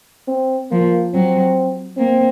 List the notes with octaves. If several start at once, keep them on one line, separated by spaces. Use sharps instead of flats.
C4
F3 A#3
F#3 C4
A#3 C4